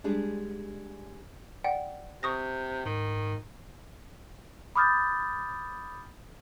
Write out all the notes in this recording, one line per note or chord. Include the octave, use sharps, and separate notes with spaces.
G3 G#3 D4 G4 G#4
D5 F#5 G5
C3 C#6 D#6 A#6
G#2 D#3
B5 D6 D#6 F6 G6 A6